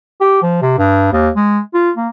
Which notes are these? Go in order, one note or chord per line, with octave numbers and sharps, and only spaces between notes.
G4
F3
C3
G2
D#2
G#3
F4
A#3